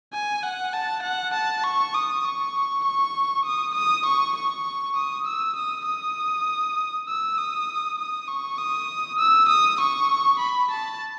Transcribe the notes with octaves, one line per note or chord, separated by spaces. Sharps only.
G#5
F#5
A5
F#5
A5
C#6
D#6
C#6
C#6
D#6
D#6
C#6
C#6
D#6
E6
D#6
D#6
E6
D#6
D#6
C#6
D#6
E6
D#6
C#6
B5
A5